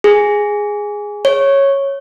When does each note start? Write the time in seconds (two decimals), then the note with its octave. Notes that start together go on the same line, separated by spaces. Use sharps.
0.04 G#4
1.25 C#5